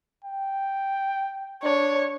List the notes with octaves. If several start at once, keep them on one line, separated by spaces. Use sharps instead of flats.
G5
D4 C#5